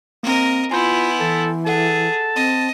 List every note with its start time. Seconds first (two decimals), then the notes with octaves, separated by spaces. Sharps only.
0.23 A#3 C4 A#4 D#5
0.71 B3 E4 F4 G#5 C6 G6
1.20 E3 A4
1.67 G#4 A4 F#5 A5
2.36 C4 D#5